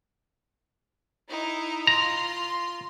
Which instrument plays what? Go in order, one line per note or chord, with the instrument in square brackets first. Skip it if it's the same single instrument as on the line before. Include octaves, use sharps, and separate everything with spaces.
[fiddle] D#4 E4
[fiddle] F4 C6 [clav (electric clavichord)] A#5